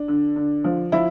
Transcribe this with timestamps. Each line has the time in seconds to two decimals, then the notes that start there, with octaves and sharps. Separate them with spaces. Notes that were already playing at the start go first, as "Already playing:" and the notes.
Already playing: D4
0.08 D3
0.36 D3
0.64 F3
0.92 F3 E4